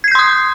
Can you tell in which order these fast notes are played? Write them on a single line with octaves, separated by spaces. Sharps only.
G#6 C7 G6 C6 D#6